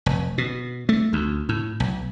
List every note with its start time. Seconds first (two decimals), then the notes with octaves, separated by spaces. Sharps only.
0.06 F1
0.38 B2
0.89 A3
1.13 D2
1.49 A2
1.80 B1